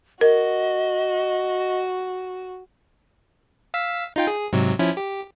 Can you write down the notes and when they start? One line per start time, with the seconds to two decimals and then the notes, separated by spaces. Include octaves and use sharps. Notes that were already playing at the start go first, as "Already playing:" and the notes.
0.21 F#4 A#4 D#5
3.74 F5 E6 B6
4.16 D#4 F4 G5
4.27 G#4
4.53 G#2 C3 F#3
4.79 F3 C#4 E4
4.97 G4